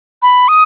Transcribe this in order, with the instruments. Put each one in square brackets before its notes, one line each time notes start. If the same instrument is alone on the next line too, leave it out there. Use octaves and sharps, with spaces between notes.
[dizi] B5
D#6